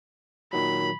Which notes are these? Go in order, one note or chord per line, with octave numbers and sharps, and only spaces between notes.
A#2 D#3 F#3 B5